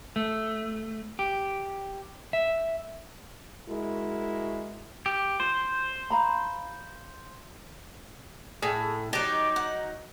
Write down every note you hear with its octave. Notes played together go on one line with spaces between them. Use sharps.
A3
G4
E5
G#3 E4 F#4 A#4
G4
F4 C5
F5 A#5 B5
A2 G#4
F#3 D#4 G4 D5
F#5